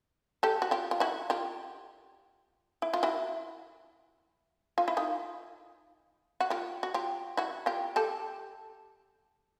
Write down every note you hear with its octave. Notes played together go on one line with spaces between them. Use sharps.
G4 A4
F#4
F4 G4
F4
E4 F#4
F4 G4
E4
F4
E4 F#4
F4
E4
D#4 F4
F#4
F4 G4
F#4
F4 G4
E4 F#4
F4 G4
G4 A4